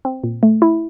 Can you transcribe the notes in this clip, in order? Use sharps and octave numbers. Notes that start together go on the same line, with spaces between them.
C4
A#2
A3
E4